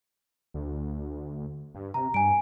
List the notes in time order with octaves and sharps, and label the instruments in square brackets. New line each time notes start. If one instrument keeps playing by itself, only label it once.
[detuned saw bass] D2
G2
[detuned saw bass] C3 [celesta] A#5
[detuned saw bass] G2 [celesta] G#5 D7